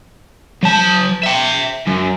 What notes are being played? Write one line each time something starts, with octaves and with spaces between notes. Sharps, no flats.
F#3 A5
E5 G5
F#2